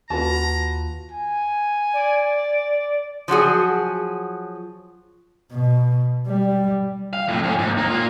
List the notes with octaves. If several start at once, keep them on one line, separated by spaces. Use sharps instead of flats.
D#2 F4 F#4 B4 A5 A#5
G#5
D5
F3 F#3 F#4 G#4
B2
G3
F5
F2 A2
F2 C#4
D#2 G#2
A#3 D#4
A#3 F4